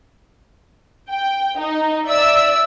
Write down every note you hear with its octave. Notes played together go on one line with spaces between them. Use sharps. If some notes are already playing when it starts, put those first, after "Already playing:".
G5
D#4
D5 E5 E6